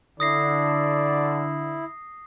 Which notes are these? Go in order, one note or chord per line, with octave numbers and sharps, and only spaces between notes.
D3 E4 D5 D#6 A#6 C7